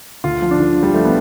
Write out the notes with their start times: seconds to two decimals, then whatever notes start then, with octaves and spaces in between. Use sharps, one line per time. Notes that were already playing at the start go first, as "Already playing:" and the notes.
0.24 D2 F4
0.42 F3
0.51 D4
0.60 D3
0.77 F3
0.83 G3
0.94 F3 A3
1.05 B3